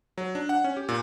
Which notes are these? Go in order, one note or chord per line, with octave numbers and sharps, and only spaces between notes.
F#3
D4
F#5
C#4
G4
A#2